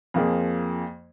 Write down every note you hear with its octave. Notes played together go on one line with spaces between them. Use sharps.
F2 F3 A#3 G#4